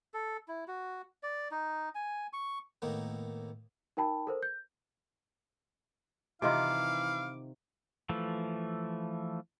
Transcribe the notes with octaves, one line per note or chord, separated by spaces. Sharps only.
A4
E4
F#4
D5
D#4
G#5
C#6
A2 D#3 A#3 B3
D#4 A#4 G5 A5 B5
A4 A#4 C5
G6
C3 D#3 E3 E4 F4 F5 D6
E3 F3 A3